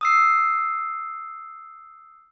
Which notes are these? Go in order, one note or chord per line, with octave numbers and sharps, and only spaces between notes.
D#6 E6 C7